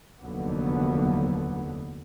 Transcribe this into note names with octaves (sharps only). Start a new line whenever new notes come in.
F1 D#2 D3 F#3 B3